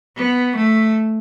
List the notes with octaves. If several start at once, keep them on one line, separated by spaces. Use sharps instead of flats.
B3
A3